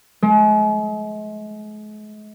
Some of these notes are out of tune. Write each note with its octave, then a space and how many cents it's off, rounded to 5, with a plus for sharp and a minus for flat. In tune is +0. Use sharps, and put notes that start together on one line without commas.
G#3 +40